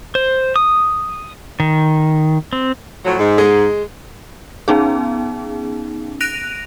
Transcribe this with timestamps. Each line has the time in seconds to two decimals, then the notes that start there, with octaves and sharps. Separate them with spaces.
0.15 C5
0.56 D#6
1.60 D#3
2.53 C4
3.05 A2 F3 F#3
3.19 G#2
3.38 G#3
4.68 B3 C#4 D#4 G#4
6.21 F#6 A#6 D7 D#7 F7